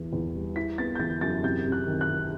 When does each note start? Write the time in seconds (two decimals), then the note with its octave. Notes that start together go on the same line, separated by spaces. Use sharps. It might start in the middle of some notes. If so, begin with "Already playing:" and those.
Already playing: E2 E3
0.13 E2
0.34 G3
0.56 E4 B6
0.78 B3 A6
0.95 G6
0.99 E3 A6
1.21 F#2 A6
1.43 C3 G6
1.66 C3
1.72 F#6
1.87 D#3
2.01 F#6
2.09 C3